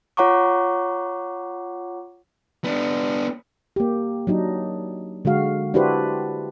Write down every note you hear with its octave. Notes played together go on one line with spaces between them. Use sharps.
F4 C#5 F#5 A#5 C#6 D6
B3 D4
A#3 G4
F#3 D4 D#4
D3 G#3 F#4 F5
D4 E4 F#4 G4 B4 C5